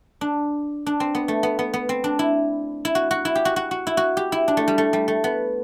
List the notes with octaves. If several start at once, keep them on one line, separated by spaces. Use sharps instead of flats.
D4
D4
C4
B3
A3
B3
B3
B3
C4
D4
E4
E4
F#4
F#4
E4
G4
F#4
F#4
F#4
E4
F#4
G4
E4
D4
A3
G3
A3
G3
A3
B3